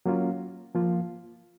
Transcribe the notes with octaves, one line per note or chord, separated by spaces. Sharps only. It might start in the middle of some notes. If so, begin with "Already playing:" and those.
F#3 A#3 C#4 F4
F3 A#3 F4